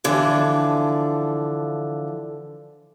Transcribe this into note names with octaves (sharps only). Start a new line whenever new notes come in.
D3 E3 F3